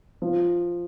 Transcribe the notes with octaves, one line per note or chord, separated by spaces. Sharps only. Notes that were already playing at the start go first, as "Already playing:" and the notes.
F3